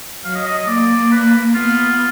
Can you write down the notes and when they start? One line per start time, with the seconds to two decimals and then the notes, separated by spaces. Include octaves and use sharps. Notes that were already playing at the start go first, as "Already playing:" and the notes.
0.24 F#3 F5
0.35 D#5
0.46 D#5
0.57 D#5
0.68 A#3 D5
1.12 B4
1.55 B3 F4